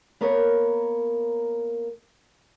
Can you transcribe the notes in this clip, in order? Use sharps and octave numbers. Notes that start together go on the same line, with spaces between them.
A#3 B3 A#4 C#5